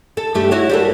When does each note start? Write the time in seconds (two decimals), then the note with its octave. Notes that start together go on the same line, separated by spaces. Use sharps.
0.17 A4
0.34 G2 A3 G4
0.51 E4 F#4 C#5
0.69 G3 A#3 A4